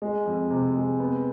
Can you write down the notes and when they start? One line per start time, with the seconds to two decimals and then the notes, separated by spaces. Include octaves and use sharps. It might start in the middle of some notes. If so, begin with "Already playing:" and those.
0.02 G#3
0.26 F2
0.51 C3
0.75 G#3
1.00 B3